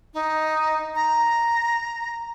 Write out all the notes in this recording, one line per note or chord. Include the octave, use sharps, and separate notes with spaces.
D#4
A#5